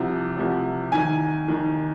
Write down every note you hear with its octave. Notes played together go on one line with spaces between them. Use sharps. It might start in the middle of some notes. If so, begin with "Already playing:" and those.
Already playing: C2 C3 F3
C2 C3 F3
D#2 D#3 G#5
D#2 D#3